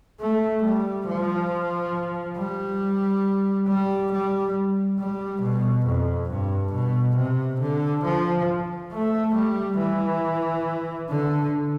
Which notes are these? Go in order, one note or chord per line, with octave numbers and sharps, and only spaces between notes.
A3
G3
F3
G3
G3
G3
G3
B2
F2
G2
B2
C3
D3
F3
A3
G3
E3
D3